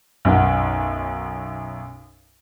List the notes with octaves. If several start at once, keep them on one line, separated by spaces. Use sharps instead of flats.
B1 F#2 F#5